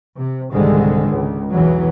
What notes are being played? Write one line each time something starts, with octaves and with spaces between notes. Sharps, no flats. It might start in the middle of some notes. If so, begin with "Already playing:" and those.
C3
C2 G#2 D3 D#3 G#3
C#2
B1 E2 E3 F#3